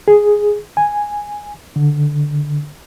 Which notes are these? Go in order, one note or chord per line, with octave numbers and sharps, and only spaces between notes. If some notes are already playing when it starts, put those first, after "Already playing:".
G#4
G#5
D3